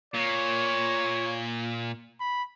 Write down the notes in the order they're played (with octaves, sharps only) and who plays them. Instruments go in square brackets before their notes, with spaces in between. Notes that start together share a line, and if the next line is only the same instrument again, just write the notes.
[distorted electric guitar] A#2 [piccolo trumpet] C#5
[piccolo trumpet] B5